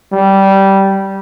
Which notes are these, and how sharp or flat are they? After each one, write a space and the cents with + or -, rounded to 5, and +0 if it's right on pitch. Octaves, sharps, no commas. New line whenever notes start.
G3 -15